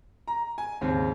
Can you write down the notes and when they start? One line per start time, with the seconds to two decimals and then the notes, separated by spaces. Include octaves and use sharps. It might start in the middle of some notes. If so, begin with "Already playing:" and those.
0.28 A#5
0.58 G#5
0.81 D#2 G#2 C#3 C4